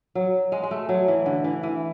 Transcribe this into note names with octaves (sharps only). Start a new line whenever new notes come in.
F#3
G#3
G#3
A3
F#3
E3
D3
E3
E3